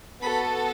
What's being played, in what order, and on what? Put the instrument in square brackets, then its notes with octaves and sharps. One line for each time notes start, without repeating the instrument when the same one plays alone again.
[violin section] B3 F#4 A4 B5